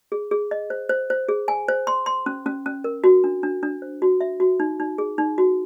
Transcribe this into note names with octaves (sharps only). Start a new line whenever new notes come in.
G#4
G#4
D#5
C5
C5
C5
G#4
G#5
C5
C6
C6
C#4
C#4
C#4
A#4
F#4
D4
D4
D4
C5
F#4
E5
F#4
D#4
D#4
G#4
D#4
F#4